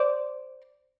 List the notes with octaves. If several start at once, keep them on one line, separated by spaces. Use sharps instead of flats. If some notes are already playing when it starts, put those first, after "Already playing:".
Already playing: C5 D5